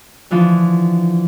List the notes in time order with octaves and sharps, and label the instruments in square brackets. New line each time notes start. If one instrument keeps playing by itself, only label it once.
[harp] D3 E3 F3